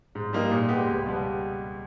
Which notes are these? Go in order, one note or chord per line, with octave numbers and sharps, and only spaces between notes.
G#2
G3 A#3 D#4
A#2
G#3 B3 G4
C#2
B2 G3 B3